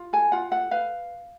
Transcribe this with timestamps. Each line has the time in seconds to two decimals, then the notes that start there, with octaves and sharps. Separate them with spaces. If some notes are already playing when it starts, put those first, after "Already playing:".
Already playing: F4
0.13 A4 G#5
0.32 F4 F#5
0.51 A4 F#5
0.71 B4 F5